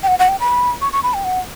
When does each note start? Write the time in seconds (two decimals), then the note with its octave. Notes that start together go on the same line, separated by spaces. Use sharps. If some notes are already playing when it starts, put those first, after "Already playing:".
0.03 G5
0.08 F#5
0.19 F#5
0.29 G5
0.40 B5
0.82 C#6
0.93 C#6
1.03 B5
1.14 G5
1.24 F#5